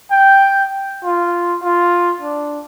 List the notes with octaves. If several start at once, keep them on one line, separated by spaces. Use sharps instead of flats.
G5
F4
F4
D4